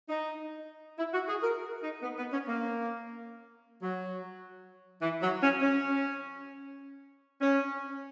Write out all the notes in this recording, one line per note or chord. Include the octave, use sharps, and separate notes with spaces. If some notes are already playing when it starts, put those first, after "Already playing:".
D#4
E4
F#4
G#4
A#4
D#4
B3
B3
C#4
A#3
F#3
E3
F#3
C#4
C#4
C#4